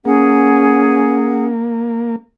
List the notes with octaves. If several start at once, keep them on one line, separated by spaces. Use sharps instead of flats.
A#3 C#4 G#4 F#5